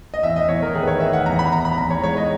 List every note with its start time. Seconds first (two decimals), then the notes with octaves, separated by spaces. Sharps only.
0.14 D#5
0.23 E2 E5
0.36 D#5
0.48 E2 C#5
0.62 A#4
0.75 D#3 G#4
0.83 B4
0.87 C#5
1.00 D#3 E5
1.13 F#5
1.26 E2 A#5
1.39 B5
1.52 E2 A#5
1.65 B5
1.78 E2 A#5
1.90 C#5
2.03 G#3 C#5
2.17 D#5